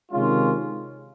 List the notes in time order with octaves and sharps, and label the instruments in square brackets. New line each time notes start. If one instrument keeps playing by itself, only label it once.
[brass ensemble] C3 D#3 G#3 C#4 F4